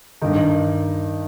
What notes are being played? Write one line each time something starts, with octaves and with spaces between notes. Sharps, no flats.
G2 D#3 D#4